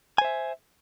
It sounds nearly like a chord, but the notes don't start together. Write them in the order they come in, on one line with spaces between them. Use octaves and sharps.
G#5 C5 E5